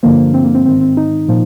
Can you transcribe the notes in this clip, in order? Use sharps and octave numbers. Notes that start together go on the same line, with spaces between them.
G2 D3 F3 A#3
C4
A#3
C4
G#2 D#3 C4
C4
D#4
A#2 F3